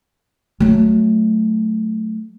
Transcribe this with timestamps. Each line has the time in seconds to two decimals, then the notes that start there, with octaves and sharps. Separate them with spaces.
0.60 F#3 A3